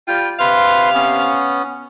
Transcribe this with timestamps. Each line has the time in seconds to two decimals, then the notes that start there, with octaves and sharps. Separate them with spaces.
0.08 G3 F4 G5
0.40 C3 B4 F5 C6
0.94 B3 C#4